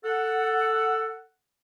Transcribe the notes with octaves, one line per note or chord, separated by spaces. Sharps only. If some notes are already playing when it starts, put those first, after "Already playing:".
A4 F#5